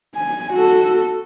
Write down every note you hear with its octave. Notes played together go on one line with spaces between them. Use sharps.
G#5
F#4 A4